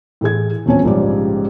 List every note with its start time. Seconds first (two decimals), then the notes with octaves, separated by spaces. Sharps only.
0.21 A2 E3 G#4 G#6
0.66 D#1 E2 C4 C#4 C#5 G#5
0.84 A#1 G#2 C#3 G3 D5